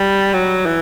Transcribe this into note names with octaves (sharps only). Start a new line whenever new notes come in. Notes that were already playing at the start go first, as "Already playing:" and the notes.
Already playing: G3
F#3
E3